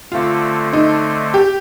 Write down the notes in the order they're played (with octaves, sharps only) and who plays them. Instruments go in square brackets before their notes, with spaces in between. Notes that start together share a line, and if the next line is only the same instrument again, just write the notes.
[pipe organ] D3 A3 C4 [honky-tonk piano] F4
[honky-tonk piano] D#4
G4